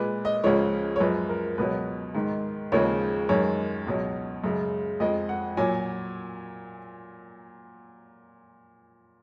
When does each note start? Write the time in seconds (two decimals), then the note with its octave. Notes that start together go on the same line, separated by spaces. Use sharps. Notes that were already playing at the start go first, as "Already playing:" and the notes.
Already playing: A#2 G#3 B4
0.25 D#5
0.44 C#2 C#3 F3 G#3 C#5
0.96 C#5
1.00 F#2 F3 G#3 B4
1.29 A#4
1.58 C#2 B2 F#3 B4
2.15 G#2 D#3 G#3
2.72 D#2 C#3 F3 G#3 C#5
3.29 F#2 D#3 G#3 C#5
3.87 C#2 B2 F#3
4.44 F#2 C#3 G#3
5.00 F2 F3 G#3 D#5
5.29 F#5
5.57 A#2 F#3 G#5